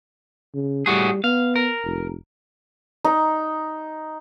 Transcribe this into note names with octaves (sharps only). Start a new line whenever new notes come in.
C#3
A2 G3 F#4 G#4
B3 F5
A#4
F1
D#4